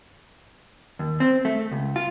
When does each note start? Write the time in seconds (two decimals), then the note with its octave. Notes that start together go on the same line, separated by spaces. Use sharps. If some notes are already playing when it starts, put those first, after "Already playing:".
0.99 D#2
1.20 C4
1.45 A3
1.71 C#2
1.96 F4